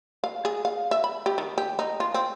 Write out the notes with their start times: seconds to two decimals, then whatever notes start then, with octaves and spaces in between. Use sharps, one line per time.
0.24 F5
0.45 G#4
0.65 F5
0.91 E5
1.04 B5
1.26 G4
1.38 D#3
1.58 G4
1.79 D#4
2.00 F4
2.14 C4